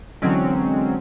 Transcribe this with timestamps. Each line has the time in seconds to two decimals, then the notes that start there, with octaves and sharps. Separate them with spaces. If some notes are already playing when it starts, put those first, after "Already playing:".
0.22 D3 E3 F#3 G#3 C4 C#4